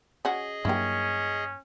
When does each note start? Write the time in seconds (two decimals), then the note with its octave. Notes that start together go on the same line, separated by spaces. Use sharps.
0.25 C#4 F#4 G#4 D#5
0.65 G2 F#3 A#3 C#4 E4 G4